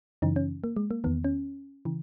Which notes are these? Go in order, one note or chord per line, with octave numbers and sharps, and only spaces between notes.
F#2 C#3 E3 D#4
C#4
A#3
G#3
A#3
E2 D#3 B3
C#4
C#3 E3